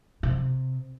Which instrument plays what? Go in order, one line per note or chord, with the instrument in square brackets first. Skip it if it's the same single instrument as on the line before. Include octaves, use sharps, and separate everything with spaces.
[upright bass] C3